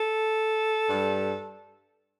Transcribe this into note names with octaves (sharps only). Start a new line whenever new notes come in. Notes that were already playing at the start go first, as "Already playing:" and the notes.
Already playing: A4
G2 G3